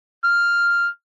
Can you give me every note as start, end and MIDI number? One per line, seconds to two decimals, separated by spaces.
0.24 0.87 89